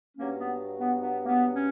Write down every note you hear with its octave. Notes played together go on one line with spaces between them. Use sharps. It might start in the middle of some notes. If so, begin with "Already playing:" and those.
G2 F#3 A#3 C#4
B3
B3
G2 F#3 B3
A#3
B3
C#4